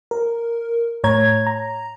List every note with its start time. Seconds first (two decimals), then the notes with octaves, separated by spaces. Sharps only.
0.11 A#4
1.04 A2 C#5 A#5 G#6
1.47 A#5